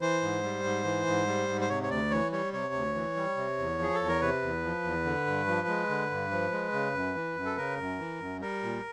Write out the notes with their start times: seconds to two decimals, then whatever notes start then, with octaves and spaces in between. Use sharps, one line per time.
0.01 E3 C5
0.22 G#2
0.43 G3
0.64 G#2
0.84 E3
1.06 G#2
1.27 G3
1.49 G#2
1.61 C5
1.69 C3 C#5
1.83 C#5
1.89 D2 D5
2.11 E3 C#5
2.32 G3 C#5
2.53 C3 C#5
2.74 D2
2.95 E3
3.16 G3
3.37 C3
3.59 E2
3.79 F3 G#4
3.95 E2 A4
4.08 A#4
4.21 C3 B4
4.42 E2
4.64 F3
4.84 E2
5.05 D3
5.26 G2
5.47 F3
5.68 G#3
5.89 D3
6.11 G2
6.31 F3
6.52 G#3
6.73 C#3
6.94 F#2
7.15 E3
7.36 F#2
7.45 A4
7.57 C#3 A#4
7.78 F#2
7.99 E3
8.20 F#2
8.41 G3 A#4
8.63 A#2